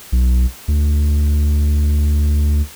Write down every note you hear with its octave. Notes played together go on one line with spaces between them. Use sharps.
B1
D2